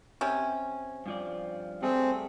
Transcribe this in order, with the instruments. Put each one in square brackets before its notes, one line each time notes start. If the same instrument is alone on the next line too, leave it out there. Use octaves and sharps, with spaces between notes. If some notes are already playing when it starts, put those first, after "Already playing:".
[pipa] C3 C#4
[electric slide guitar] G2 F3 D5
[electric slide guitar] G3 A3 G#4 [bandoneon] C4